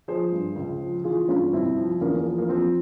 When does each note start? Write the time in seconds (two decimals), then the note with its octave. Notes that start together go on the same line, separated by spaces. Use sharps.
0.08 F3 G#4 C5
0.32 G2
0.56 C#2
0.81 F3
1.04 E3 F4 G#4
1.29 G2 C#4 F4
1.53 C2 C4 E4
1.77 F3
2.01 E2 A#3 C#4
2.13 A#3
2.25 F3
2.38 A#3
2.49 F3 C4